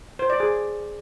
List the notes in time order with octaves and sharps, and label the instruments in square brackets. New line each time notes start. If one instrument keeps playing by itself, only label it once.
[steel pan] C5
D5
G#4